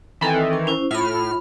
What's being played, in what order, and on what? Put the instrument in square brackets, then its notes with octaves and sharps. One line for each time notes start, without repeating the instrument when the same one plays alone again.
[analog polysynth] D#3 E3 [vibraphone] C4 A4 G5
[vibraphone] A#4
C#4 E4 C5
[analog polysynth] A2 F6 [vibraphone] F4 B5